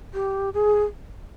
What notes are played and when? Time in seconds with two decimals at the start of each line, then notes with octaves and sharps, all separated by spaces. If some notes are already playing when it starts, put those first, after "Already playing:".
0.14 G4
0.54 G#4